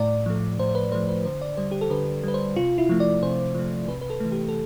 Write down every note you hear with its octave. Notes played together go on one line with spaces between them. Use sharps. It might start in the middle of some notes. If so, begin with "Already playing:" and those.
Already playing: A2 D5
F3 A3
A2 C5
C5
B4
F3 A3 C5
B4
D3 C5
D5
G3 C5
G4
A4
D3 B4
G3 B4
C5
C3 F4
E4
F3 A3
D5
C3 C5
F3 A3
C3 B4
B4
A4
E3 A3
G4
A4